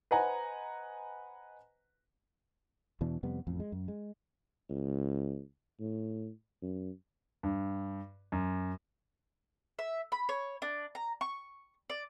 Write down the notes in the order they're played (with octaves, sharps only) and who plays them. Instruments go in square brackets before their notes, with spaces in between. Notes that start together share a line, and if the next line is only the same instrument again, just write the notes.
[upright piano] B4 C5 D#5 F#5 G#5 A#5
[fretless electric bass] E2 B2 E3 D4
F2 C3 G3 B3
A1 F2
G#3
F#2
G#3
[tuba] C#2
A2
F#2
[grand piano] G2
F#2
[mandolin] E5
B5
C#5
D4
A#5
C#6
D5